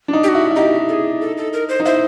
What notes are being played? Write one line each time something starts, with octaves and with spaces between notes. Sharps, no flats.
D4
D#4
G4
F#4
E4
E4
D#4 G4
A4
G#4
A4
A4
A#4
C5
D#4
E4 C5